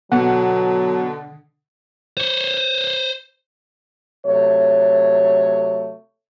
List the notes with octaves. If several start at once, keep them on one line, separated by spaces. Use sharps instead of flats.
B2 D3 F#3 F#5
C5 C#5
C3 F#3 A3 C#5